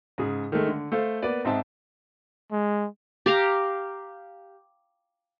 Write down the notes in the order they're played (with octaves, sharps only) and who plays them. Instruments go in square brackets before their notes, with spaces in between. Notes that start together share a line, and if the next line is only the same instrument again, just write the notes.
[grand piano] G#2 C#3 G#4
D#3 G#3 A3
D3
A3 A4 C5 F5
A#3 B3 B4 D5
G#2 C4 D#4 E5 A5
[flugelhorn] G#3
[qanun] G4 F5 A#5